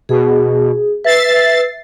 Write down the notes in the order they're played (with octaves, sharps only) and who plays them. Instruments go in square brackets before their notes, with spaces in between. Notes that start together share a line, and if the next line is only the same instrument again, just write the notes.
[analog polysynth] B2 [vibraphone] G#4
[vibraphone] B4 [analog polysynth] E5 A6 C7